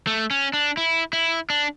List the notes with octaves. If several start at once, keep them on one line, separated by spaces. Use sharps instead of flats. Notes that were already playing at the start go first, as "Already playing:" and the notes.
A3
C#4
D4
E4
E4
D4